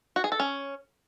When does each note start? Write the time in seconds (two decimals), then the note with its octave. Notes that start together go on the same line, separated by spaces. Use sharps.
0.16 F#4
0.24 G#4
0.32 A4
0.40 C#4